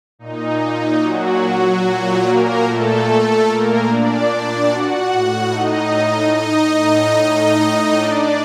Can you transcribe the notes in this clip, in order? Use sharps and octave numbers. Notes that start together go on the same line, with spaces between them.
A#2 D#4
F#3 F#4
A#2
A#3 A#4
A3 A4
A#2 A#3 A#4
D4 D5
F#4 F#5
A2
D#4 D#5
D#4 D#5
A2
D4 D5